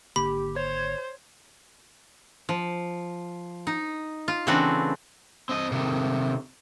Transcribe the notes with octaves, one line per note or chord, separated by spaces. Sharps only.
G#1 D3 A#3 G4 B5
C5 C#5
F3
D#4
F4
C#3 E3 A3 C4 D4 F#4
C4 D#5
C3 D#3